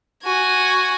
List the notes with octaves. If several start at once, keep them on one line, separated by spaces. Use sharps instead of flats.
F#4 G#5